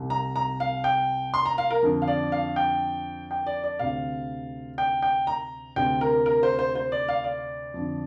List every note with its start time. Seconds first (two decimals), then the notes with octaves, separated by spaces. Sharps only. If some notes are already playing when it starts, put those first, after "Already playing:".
Already playing: C2 C3
0.10 A#5
0.36 A#5
0.60 F5
0.84 G5
1.34 C6
1.46 A#5
1.58 F5
1.71 A#4
1.82 F2 D3
2.02 F5
2.08 D5
2.32 F5
2.56 G5
3.31 G5
3.46 D5
3.64 D5
3.79 D2 C3 F5
4.78 G5
5.02 G5
5.27 A#5
5.76 D2 C3 G5
6.01 A#4
6.26 A#4
6.43 C5
6.59 C5
6.75 C5
6.92 D5
7.08 F5
7.24 D5
7.74 F2 D3